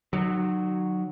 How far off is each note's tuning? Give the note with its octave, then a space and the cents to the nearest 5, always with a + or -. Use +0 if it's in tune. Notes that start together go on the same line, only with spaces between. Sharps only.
D#3 -35 F#3 +0